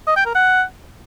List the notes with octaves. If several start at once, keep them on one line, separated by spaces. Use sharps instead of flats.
D#5
G5
A#4
F#5